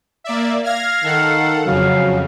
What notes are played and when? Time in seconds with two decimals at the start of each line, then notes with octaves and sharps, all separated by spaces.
0.24 A#3 D5 E5
0.64 F5 F6 G#6 A#6
1.04 D#3 A4 F#5
1.66 F2 C#3 F#3 F5